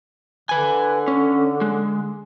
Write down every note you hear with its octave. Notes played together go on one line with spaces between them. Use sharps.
D3 B4 G#5
C#4
G#3